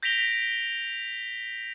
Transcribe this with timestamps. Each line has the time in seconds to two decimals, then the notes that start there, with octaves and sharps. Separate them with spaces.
0.03 G6 A#6 B6 D7 F7 G7